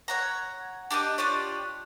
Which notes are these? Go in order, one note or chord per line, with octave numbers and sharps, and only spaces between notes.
C#5 F#5 A#5
D4 G4 D5 D#5
D4 F4 G4 C#5